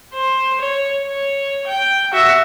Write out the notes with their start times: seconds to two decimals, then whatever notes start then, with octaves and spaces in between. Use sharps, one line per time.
0.14 C5
0.61 C#5
1.04 C#5
1.67 G5
2.13 F#4 E5